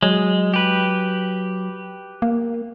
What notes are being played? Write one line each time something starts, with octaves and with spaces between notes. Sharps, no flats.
F#3 G#3
G4 B4
A#3